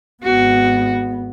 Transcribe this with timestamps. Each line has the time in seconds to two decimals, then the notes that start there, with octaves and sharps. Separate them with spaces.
0.23 G#1 B3 F#4